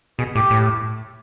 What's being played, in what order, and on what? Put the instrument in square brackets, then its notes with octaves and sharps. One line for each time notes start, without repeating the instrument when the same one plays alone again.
[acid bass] B2 [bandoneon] G#4
[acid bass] A2 [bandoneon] G4
[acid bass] A2